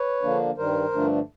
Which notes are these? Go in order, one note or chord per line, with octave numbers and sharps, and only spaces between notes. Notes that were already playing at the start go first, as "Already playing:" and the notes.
Already playing: B4 C#5
D3 F3 A#3 D4
G2 D#3 G3 A#4 C5
G2 D3 F3 A3 D4